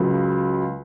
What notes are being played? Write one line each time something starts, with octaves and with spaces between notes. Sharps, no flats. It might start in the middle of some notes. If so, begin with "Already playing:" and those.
Already playing: C#2 C#3 F#3